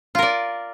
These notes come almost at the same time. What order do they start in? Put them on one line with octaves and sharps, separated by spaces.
F4 A#4 D5